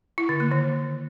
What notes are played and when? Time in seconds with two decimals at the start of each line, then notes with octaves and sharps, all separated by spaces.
0.18 E4
0.29 D3
0.40 A#3
0.51 D#3